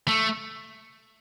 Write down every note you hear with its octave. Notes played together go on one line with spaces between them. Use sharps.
A3